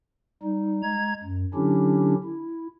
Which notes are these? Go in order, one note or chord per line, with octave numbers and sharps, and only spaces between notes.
G3 D#4
G#3 A#5 G#6
F#2
D3 F#3 C#4 D4 E4 G4
E4